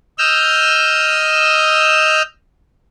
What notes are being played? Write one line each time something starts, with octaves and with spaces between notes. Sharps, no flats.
D#5 E6 F6 G6